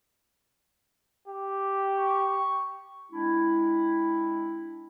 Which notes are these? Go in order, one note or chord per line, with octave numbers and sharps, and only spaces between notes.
G4
C#6
G#3 C4 D4 E4